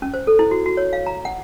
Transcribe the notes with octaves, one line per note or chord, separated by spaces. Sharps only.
C#4
C5
A4
E4
F#4
F#4
C#5
F5
A#5
F#5